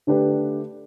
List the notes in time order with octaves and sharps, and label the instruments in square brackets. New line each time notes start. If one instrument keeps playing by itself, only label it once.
[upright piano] D3 A3 D4 G4 B4